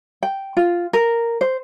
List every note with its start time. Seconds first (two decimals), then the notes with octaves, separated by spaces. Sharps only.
0.23 G5
0.57 F4
0.93 A#4
1.41 C5